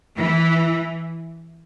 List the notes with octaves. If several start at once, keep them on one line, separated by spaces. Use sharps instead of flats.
E3